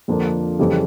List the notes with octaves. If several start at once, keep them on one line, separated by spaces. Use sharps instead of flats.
F2 D3 F3 A#3 D4
F2 C#3 E3 G3